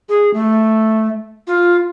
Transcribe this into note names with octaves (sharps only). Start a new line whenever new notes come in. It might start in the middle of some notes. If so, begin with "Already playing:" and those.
G#4
A3
F4